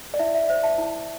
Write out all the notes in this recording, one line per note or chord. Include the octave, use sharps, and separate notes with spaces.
D5
E4 E5
E5
D5
C5 E5
E5 A5
E4